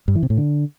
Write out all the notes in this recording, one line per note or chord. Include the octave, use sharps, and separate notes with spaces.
G2
E3
C3
A2
D3